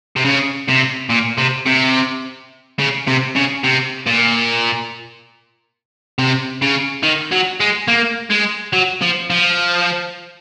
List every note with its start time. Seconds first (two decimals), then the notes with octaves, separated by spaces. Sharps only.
0.16 C3
0.25 C#3
0.68 C3
1.10 A#2
1.38 C3
1.66 C3
2.79 C#3
3.07 C3
3.35 C#3
3.64 C3
4.07 A#2
6.19 C3
6.62 C#3
7.03 D#3
7.32 F#3
7.60 G#3
7.88 A#3
8.30 G#3
8.73 F#3
9.02 F3
9.30 F3